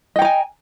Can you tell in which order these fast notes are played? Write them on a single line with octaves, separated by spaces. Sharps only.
D#5 G5 A#5 G#5